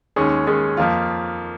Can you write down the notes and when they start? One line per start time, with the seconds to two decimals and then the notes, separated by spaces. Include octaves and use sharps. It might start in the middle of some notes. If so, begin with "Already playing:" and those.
0.16 D#2 D#3 G#3 C#4 G#4
0.47 D#2 D#3 G#3 C#4 G#4
0.77 F2 F3 A#3 F4